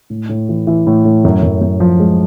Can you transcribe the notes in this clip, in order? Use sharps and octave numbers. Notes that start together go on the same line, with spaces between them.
A2
A2
E3
E3
A2
A2
F#2
F#2
F#2
F3
G#3